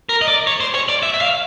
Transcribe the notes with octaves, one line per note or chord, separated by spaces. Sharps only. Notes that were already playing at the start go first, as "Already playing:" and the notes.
A#4
D#5
D5
C#5
C5
C#5
D5
E5
E5
F5